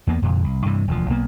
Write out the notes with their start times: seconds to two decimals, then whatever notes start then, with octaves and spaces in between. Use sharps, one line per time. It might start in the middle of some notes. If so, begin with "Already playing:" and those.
0.07 E2 A#3 B3
0.22 F1 F2 A#2 D3
0.44 C2
0.66 G2 C3 E3
0.88 E1 D2 D#3 F3
1.09 B1 A#3 B3